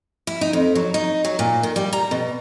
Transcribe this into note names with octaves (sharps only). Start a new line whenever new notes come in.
E4
D#4
F2
F#3
D#4
F#3
A#2
D#3
G3
A#5
B2